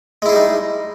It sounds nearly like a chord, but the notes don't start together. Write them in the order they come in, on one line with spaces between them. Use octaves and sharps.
G#3 E4 G#4 G3 D#4